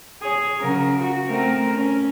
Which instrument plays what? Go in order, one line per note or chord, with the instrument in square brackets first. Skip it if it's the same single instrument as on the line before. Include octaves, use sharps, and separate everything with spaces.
[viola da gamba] G#4 C#5
C#3 F#3 A#4
F#4
A3 C4 A#4
C#4